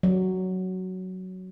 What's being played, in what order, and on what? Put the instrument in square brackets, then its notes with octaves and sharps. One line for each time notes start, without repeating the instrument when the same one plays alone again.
[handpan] F#3